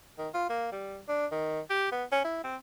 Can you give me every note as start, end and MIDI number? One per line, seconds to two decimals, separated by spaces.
0.18 0.28 51
0.34 0.48 65
0.49 0.71 58
0.72 0.99 55
1.08 1.26 62
1.32 1.60 51
1.70 1.88 67
1.92 2.04 59
2.12 2.20 61
2.24 2.40 64
2.44 2.56 60